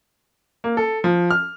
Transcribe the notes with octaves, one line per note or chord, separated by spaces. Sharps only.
A#3
A4
F3
F6